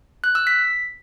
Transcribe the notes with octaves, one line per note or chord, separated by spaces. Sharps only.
F#6
E6
B6